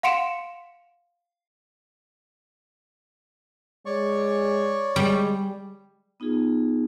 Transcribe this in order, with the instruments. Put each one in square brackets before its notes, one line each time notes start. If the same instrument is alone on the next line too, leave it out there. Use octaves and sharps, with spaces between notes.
[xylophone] F5 F#5 C6 C#7 D7 E7
[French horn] G#3 [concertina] C#5 D5 C#6
[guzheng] G3 [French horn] G#3
[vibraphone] B3 D#4 F4 G#4